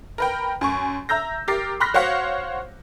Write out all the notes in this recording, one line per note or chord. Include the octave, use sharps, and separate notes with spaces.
A#4 B4 G5
F#2 G#5 C#6
E5 A#5 E6 G6 A#6
G4 A#4 D6 A6 C7
B5 C6 F6 F#6 A#6 B6
F#4 C5 C#5 F5 F#5